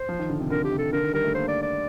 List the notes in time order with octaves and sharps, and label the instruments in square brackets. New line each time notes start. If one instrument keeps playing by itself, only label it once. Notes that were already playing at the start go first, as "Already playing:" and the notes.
Already playing: [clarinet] C5
[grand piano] F3
D#3
D3
C3
[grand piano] D3 [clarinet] A#4
[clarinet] G4
[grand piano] C3
[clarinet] A4
[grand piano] D3 [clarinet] A#4
[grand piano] D#3
[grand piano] G3 [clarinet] A#4
[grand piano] A3
[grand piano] A#3 [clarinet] C5
[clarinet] D5
D5